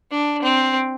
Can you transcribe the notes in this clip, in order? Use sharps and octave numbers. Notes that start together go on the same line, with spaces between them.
D4
C4